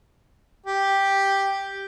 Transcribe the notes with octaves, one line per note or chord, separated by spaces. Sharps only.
G4